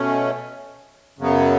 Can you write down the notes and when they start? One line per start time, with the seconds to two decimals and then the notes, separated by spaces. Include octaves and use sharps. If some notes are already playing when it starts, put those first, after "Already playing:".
Already playing: B2 A3 C#4
1.18 F#2 C#3 F#3 B3